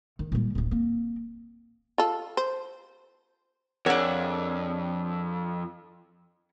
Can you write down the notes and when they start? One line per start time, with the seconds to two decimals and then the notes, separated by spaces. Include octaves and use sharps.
0.19 D#3
0.32 A#2 G3
0.55 D1 A1
0.71 A#3 C4
1.98 F4 A4
2.37 C5
3.86 F2 D4 G#4 A#4 C#5 F#5